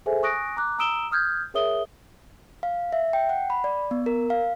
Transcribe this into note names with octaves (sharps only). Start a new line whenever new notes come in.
G#4 A4 C5 E5 G#5
G#5 C#6 D#6 F#6 A#6 D7
A#5 D6 F#6
A#5 D#6 E6 D7 E7 G7
D#6 F6 G6 G#6
G#4 A#4 C#5 E5 D#6 G7
F5
E5
G5
F#5
B5
D5
B3
A#4
F5